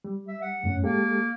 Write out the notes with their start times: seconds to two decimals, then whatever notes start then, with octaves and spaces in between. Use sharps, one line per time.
0.04 G3
0.28 E5
0.42 F#5
0.64 F#2 A2 C#4
0.83 G#3 A#3 G4 A4